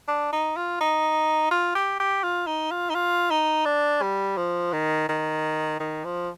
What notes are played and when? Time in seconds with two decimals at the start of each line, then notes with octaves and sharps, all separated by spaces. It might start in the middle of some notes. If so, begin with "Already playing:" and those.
0.08 D4
0.32 D#4
0.56 F4
0.81 D#4
1.51 F4
1.75 G4
2.00 G4
2.23 F4
2.46 D#4
2.71 F4
2.90 D#4
2.95 F4
3.31 D#4
3.65 D4
4.02 G3
4.37 F3
4.73 D#3
5.09 D#3
5.80 D#3
6.04 F3